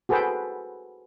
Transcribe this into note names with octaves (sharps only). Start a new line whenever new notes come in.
F#4 G#4 A4 B4 C5 G5